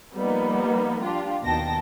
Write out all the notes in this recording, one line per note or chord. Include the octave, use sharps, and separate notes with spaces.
F3 G3 A#3 B3 D#4
D4 F4 G4
D#2 B2 D#3 G5 A5 A#6